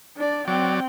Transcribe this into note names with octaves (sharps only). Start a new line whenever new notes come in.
D4 D5
F#3 C4 D5 G5